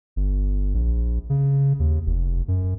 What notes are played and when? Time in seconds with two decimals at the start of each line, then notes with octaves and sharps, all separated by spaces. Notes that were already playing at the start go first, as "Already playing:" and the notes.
0.16 G1
0.74 A#1
1.30 C#3
1.79 D#2
2.06 F1
2.48 F#2